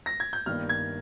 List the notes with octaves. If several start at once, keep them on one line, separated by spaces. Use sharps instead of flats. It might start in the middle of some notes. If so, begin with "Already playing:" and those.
A#6
G#6
G6
G1 G2 D#3 A#3 F6
G#6